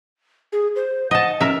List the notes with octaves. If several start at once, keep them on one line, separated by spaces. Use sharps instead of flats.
G#4
C5
D#5 F#5 A5
C#4 A#4 E5